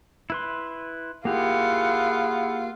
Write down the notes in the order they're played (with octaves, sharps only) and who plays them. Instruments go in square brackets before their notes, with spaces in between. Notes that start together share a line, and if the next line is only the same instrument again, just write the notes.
[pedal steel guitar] E4 B4 C6
[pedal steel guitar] A#3 G4 [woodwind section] E4 G#4 F#5 [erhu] F4